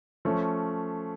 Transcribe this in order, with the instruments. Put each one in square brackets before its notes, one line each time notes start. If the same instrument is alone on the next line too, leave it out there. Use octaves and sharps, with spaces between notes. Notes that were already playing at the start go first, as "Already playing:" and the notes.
[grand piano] F3 A3 C#4